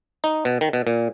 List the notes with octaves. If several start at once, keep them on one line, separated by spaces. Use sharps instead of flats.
D#4
B2
D#3
B2
A#2